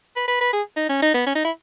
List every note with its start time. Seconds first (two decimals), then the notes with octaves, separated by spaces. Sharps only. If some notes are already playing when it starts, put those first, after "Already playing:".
0.16 B4
0.28 B4
0.41 B4
0.53 G#4
0.77 D#4
0.89 C#4
1.02 D#4
1.14 B3
1.27 C#4
1.35 D#4
1.45 E4